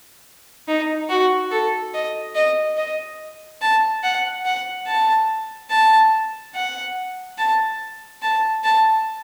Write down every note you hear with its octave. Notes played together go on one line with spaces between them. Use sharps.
D#4
F#4
A4
D#5
D#5
D#5
A5
F#5
F#5
A5
A5
F#5
A5
A5
A5